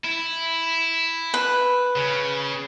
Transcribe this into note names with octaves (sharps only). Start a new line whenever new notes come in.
E4
B4
C#3